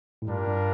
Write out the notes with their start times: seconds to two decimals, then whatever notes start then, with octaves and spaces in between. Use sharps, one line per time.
0.22 A2
0.28 G2 G3 D4 F4 A#4
0.48 G2